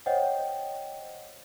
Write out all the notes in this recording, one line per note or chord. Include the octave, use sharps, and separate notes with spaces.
C5 C#5 D#5 F#5 G5